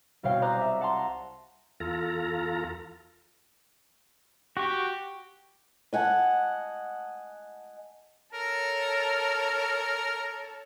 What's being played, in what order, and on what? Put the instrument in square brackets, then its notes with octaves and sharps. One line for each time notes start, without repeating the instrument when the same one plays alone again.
[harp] C2 B2 C#5 F5 G5
C5 D5 D#5 A#5 D6 F#6
E5
F#5 A5 A#5 C6
[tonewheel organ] E2 F4 A4 A#5
[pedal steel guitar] F#4 C#6 [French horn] G4
[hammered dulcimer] D#5 F#5 G#5 A5
[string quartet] A4 C#5 [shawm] A#4